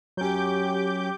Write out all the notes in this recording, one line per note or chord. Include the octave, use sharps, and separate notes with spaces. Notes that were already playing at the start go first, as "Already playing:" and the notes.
F#3 C#4 G4 D6 G6